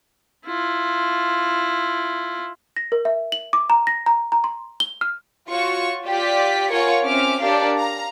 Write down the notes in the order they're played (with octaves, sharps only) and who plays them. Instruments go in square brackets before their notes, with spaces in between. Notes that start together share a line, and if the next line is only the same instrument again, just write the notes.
[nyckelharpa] E4 F4
[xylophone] A#6
A#4
E5
F#7
D6
A#5
A#6
A#5
A#5
C6
G7
F6
[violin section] F4 F#4 C#5 C#6
F4 G4 D5 B6
F4 A#4 C#5 F#5 G#5 C#6
C4 C#4 E5 D6 F6
D4 G4 A#4 C#5 D5 F5
F5 A#5